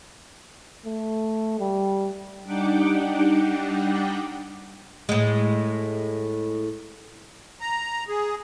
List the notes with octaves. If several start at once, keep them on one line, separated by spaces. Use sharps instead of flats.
A3
G3
G3 D4 D#4 F#5 G5 D6
A2 G#3
A#5
G#4